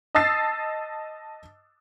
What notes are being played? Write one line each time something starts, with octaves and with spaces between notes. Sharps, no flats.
D#5 A5 D#6 E6 A6 C7